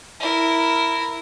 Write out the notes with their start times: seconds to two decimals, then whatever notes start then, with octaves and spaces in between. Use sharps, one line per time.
0.20 E4 A#4